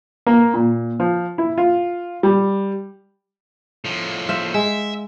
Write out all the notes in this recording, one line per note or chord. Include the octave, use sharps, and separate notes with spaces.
A#3
A#2
F3
E4
F4
G3
A2 F3
C5 E5 F5
G#3 E5